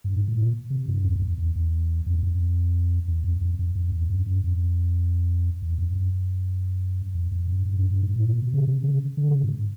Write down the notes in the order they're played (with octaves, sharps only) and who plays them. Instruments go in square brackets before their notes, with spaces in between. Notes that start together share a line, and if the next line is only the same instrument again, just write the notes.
[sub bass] G2
G#2
A2
A#2
C3
G2
E2
F2
E2
E2
E2
F2
E2
F2
E2
F2
F2
F2
F2
E2
F#2
F#2
F2
E2
F2
F#2
F2
F2
F#2
G2
F#2
G2
G#2
A2
A#2
B2
C#3
C3
C#3
D3
C#3
G#2